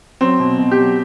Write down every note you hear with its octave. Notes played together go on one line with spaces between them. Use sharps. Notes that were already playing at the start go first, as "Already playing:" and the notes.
F#3 C4
B2
B2
G4
F#3